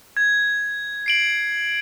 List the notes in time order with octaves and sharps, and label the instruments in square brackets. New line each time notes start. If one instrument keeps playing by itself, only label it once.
[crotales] G#6
C7 D7 F#7